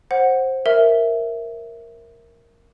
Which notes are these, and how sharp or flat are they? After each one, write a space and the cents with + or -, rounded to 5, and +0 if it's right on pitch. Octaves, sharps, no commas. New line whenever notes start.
C5 +15 F#5 +0
A#4 +0 E5 +0